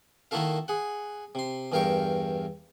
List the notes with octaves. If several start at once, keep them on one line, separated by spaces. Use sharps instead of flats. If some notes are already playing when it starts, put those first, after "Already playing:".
D#3 A#3 E4 F#4 A4 F5
G#4 F#5
C3 C6
E2 G2 A#4 F5 G5 C#6